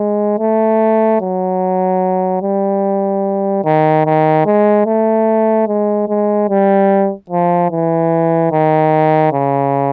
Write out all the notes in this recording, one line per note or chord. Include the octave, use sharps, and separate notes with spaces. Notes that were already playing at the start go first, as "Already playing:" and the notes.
Already playing: G#3
A3
F#3
G3
D#3
D#3
G#3
A3
G#3
G#3
G3
F3
E3
D#3
C#3